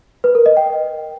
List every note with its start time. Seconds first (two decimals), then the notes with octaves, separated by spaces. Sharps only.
0.24 B4
0.35 A#4
0.46 D#5
0.57 G5